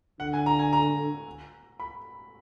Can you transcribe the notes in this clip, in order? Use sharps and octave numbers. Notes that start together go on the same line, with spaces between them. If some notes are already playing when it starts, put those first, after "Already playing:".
D3 F#5
G#5
A#5
G#5
A#5
B5